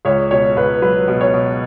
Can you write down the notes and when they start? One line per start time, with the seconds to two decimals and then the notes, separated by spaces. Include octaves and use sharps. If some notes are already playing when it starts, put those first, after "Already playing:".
0.05 C#2 C#5
0.31 B2 C#5
0.56 C#2 B4
0.82 F#3 B4
1.07 B2
1.21 C#5
1.33 B2